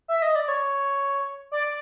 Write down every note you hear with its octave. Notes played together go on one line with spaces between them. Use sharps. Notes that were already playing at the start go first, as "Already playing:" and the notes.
E5
D#5
D5
C#5
D5